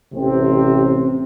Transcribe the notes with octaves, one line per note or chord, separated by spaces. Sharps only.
A1 C3 C4